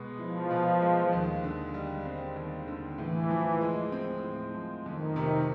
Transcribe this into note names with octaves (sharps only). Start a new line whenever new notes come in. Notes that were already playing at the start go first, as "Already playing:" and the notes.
Already playing: B2 G#3 B3
F3 E4
B2
G#3
D#2
D3
G3
C4
D#2
D3
A2 E3
F3
G#3
C4
A2
F3
F2 D#3
C3